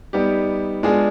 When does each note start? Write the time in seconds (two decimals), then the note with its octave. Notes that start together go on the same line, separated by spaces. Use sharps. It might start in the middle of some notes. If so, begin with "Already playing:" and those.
0.13 G3 B3 D#4 G4
0.83 G#3 B3 D4 F4 G#4